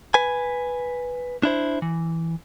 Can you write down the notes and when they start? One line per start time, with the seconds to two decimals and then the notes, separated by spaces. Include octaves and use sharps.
0.14 B4 G#5
1.43 D4 E4 C5
1.82 E3